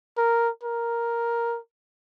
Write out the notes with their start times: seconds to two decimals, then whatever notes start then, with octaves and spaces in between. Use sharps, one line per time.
0.17 A#4
0.63 A#4